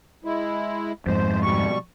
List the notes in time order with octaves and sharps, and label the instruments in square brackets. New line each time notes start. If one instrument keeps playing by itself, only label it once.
[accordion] G#3 E4
[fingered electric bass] F2 G#2 [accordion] C5
[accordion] B2 G3 C#6